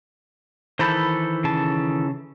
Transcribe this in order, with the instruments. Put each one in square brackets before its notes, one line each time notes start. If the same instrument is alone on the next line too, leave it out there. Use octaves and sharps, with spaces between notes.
[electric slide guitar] D#3 E3 A4 [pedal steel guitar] C5 B5 G6
[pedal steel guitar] C#3 A5